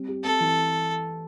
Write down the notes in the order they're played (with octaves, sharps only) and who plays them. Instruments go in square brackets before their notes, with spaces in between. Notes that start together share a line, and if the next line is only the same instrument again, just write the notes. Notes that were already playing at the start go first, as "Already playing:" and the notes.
Already playing: [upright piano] G3 C4
G4
[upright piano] C4 [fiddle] A4
[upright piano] E3